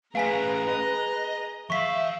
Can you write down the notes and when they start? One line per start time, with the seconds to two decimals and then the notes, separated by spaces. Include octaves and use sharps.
0.15 A3 C#4 G#4 B4 F5 G#5 A#5 B6
0.68 D#5
1.70 E3 E5 F5 C#6 B6